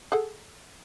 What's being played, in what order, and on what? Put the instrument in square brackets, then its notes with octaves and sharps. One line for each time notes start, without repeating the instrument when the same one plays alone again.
[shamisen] G#4 A4 F#5